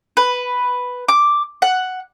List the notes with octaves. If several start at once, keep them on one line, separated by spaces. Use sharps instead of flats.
B4
D6
F#5